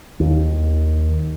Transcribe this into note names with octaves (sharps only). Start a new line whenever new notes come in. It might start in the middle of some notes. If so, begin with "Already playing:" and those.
D#2